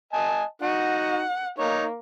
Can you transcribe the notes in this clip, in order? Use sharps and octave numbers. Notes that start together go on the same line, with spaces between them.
D#5 G#5 A5
D#4 F#4 F#5
A#3 D#4 C#5